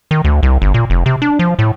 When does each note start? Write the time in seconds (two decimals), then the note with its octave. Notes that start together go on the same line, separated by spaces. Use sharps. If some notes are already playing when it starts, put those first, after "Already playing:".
0.11 D#3
0.24 D2
0.43 C2
0.62 G1
0.74 A#2
0.90 F1
1.06 C3
1.22 D4
1.39 F3
1.59 A2